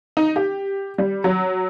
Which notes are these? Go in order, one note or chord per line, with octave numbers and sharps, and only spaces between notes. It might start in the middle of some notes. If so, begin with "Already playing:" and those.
D#4
G4
G3
F#3